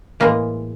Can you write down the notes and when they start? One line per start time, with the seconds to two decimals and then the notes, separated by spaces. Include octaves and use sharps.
0.20 A2 E3 G#3 A#3